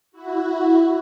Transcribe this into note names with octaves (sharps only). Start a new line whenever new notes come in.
E4 F#4